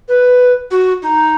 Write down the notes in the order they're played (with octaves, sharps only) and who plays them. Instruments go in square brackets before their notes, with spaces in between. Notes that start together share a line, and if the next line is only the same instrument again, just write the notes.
[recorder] B4
F#4
D#4